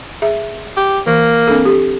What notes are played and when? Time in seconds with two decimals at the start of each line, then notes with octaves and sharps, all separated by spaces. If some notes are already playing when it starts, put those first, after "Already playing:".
0.22 G#4 E5
0.77 G4
1.07 E3 A#3
1.48 C4 D4 A4
1.65 G4 A4